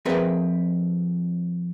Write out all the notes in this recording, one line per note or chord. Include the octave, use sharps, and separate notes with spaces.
F2 C4 G#4 A#4 B4 E5